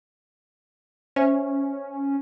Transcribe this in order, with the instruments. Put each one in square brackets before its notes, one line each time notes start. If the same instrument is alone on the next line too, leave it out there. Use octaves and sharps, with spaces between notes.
[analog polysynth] C#4 [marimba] C5 E5